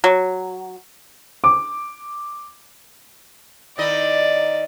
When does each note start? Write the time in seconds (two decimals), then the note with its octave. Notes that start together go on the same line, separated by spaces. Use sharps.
0.04 F#3
1.44 D6
3.78 D#3 E4 D5 D#5